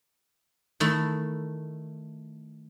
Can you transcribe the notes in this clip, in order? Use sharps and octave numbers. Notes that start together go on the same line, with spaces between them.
D#3 A3 E4